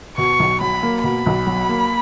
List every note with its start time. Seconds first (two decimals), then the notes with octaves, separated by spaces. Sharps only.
0.17 B2 C#6
0.39 B1
0.61 F#3 B5
0.83 A#3
1.04 B2 B5
1.26 B1
1.47 F#3
1.69 A#3